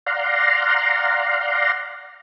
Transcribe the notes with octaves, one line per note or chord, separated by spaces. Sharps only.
D5 F5 F#5 A#5 C6